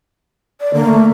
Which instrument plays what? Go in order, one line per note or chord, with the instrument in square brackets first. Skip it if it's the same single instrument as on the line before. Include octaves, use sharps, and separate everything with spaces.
[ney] D5
[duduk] D3 [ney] A#3
[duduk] A3